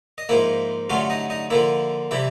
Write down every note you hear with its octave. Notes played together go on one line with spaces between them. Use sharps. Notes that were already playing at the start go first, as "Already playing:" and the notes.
D#5
G#2 F3 A#3 E4 E5
G2 D3 F#3 A3 C#4 F4 F5
D#4 D#5
D#4 D#5
D3 F3 A#3 E4 E5
C3 E3 G3 E4 E5